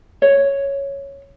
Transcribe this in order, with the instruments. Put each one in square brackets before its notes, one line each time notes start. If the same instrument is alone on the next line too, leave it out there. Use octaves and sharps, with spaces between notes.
[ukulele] C#5